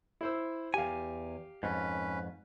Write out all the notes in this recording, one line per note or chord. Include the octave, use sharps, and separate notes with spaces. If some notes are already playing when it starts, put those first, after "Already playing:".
E4 C5 E6
E2 G4 F5 G#5
F2 G#2 C#4 B4